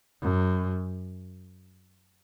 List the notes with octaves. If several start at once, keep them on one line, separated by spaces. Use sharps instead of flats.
F#2